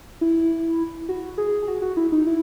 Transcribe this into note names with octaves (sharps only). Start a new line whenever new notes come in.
E4
F#4
G#4
G#4
F#4
F#4
E4
D#4
E4